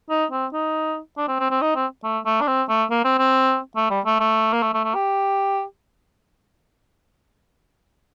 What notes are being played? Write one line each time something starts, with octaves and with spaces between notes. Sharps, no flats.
D#4
C4
D#4
D4
C4
C4
C4
D#4
C4
A3
A3
D4
C4
A3
A#3
C4
C4
A3
G3
A3
A3
A#3
A3
A3
A3
G4